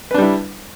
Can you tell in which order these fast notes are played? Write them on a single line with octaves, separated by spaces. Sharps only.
B4 D4 G3 E4